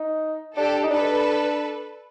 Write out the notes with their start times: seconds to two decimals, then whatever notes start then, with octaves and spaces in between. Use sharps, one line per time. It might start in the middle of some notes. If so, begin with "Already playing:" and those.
Already playing: D#4
0.56 D4 G4 A4
0.84 D#4
0.91 D4 A4 B4